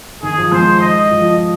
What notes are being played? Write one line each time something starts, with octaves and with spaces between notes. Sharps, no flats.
D#3 G#4
F3
G#3 C5
D#5
F3